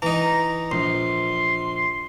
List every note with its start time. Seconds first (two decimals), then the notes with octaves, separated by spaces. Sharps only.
0.02 E3 D#4 A#5
0.72 A#1 C6